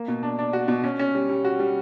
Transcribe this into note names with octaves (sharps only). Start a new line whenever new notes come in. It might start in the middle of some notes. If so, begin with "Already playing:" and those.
Already playing: A#3
B2
D4
D4
F#4
B2
C#4
C#4
G3
G3
F#4
G3